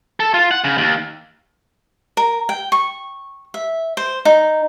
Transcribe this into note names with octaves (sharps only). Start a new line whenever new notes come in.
A4
F4
F#5
C#3
D#2
A#4
G5
C#6
E5
C5
D#4